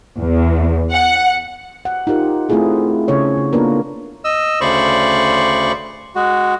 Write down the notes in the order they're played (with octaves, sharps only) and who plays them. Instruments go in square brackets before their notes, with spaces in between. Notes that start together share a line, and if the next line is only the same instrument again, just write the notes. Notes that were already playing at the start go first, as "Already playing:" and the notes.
[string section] E2
F#5
[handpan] F#5
D#4 F4 G4 A#4
A3 C4 E4 F4 G#4 A4
C#3 C#4 A4 C#5
C#3
A#3 B3 D4 F4 A#4 B4
[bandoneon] D#5 E6
D2 C#3 C5 D5 B5 C#6
G#3 F#4